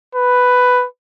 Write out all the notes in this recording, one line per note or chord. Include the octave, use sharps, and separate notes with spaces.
B4